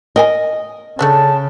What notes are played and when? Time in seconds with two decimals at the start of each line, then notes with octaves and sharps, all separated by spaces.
0.16 A#4 D#5 G5 G#5
0.99 C#3 A3 C#4 D4 A5